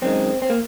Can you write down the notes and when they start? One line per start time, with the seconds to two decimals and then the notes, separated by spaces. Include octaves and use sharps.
0.02 F#2 D#3 G#3 C4
0.42 C4
0.50 A#3